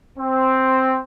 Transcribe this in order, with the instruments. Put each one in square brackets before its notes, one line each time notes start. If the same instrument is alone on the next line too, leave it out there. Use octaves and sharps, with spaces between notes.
[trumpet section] C4